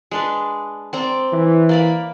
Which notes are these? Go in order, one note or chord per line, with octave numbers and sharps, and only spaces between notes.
G#3 D4 B4
C4 D5 A#5
E3
A#3 D5 B5